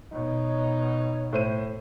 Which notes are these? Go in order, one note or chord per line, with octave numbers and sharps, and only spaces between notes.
B2 D#4 C#5
A2 C5 D#7